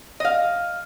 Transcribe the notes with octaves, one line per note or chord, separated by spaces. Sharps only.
D#5 F5